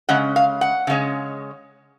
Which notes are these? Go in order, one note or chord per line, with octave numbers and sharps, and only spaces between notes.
C#3 G#3 C#4 F#5
F5
F#5
C#3 G#3 C#4